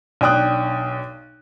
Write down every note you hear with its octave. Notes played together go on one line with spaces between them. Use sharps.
B1 D4 G5 D#6 F#6